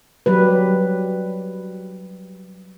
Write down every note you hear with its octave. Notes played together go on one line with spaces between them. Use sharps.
F#3 G3 B4